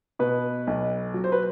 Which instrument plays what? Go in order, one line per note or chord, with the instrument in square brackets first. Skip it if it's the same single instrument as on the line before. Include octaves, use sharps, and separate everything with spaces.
[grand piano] B2 B4
B1
F#3
C5
B4